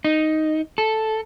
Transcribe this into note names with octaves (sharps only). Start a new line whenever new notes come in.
D#4
A4